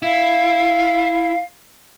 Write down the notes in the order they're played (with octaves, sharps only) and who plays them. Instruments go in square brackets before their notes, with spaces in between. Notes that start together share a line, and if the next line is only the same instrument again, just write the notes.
[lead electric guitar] E4 [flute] F5